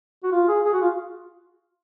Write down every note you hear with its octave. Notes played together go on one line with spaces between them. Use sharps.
F#4
F4
G#4
G#4
F#4
F4